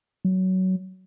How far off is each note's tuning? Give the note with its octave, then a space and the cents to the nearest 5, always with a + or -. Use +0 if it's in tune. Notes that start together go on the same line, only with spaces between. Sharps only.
F#3 +15